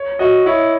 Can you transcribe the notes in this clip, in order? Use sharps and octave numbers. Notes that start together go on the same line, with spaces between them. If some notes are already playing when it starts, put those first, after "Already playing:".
Already playing: C#5
F#4 D#5
E4 C#5